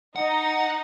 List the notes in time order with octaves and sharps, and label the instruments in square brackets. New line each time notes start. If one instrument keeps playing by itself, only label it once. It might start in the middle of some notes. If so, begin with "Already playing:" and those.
[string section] D#4 [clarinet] D#5 [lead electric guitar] F#5